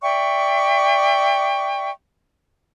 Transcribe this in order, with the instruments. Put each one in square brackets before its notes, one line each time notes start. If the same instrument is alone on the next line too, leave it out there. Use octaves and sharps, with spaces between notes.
[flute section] D5 E5 G5 C#6